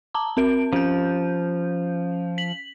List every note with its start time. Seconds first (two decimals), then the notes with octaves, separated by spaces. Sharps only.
0.14 A5 A#5 D6
0.37 C4 A#4 D7
0.73 F3 C#4 G6
2.38 B6 F#7